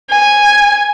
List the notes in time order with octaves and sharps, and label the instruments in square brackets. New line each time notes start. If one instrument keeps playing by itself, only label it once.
[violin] G#5